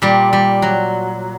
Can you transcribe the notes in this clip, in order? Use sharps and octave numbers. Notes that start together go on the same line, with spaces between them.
A#2 G3
G3
F#3